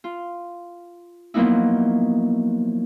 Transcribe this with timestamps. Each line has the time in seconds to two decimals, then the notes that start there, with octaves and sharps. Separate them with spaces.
0.04 F4
1.34 F3 F#3 A#3 B3 D#4 E4